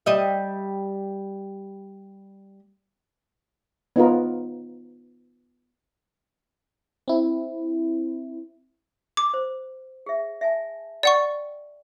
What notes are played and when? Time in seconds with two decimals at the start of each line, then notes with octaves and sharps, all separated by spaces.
0.06 G3 D#5 E5
3.96 B3 D#4 F4 A#4
7.08 C4 E4
9.17 D6
9.34 C5
10.06 G#4 E5
10.41 E5 G#5 A5
11.03 D5 F#5 G5 C#6